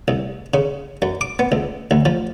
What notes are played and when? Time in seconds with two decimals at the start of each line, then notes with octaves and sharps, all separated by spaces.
0.08 C2
0.54 C#3
1.02 F#2
1.21 D6
1.39 B3
1.52 C#2
1.91 D2
2.06 F3